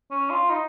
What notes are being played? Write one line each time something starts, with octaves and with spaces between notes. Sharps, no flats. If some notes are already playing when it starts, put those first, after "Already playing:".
C#4
F4
D#4